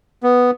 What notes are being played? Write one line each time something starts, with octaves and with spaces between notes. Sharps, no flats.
B3